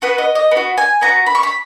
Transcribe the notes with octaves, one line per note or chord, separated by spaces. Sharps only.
B3 F#4 B4
D#5
D#5
B3
F#4
G#5
B3 F#4 A#5
B5
C#6
B5